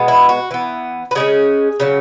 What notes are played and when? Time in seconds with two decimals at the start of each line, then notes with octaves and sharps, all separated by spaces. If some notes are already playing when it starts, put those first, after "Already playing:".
Already playing: B2 G#3 B3
0.08 E4
0.29 F#4
0.51 E3 B3
1.11 B4
1.15 C#3 G#3 C#4 G#4
1.80 C#3 F#3 C#4